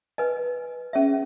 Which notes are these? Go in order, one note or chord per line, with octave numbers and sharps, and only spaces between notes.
B4 D#5 G#5
C#4 G#4 C#5 E5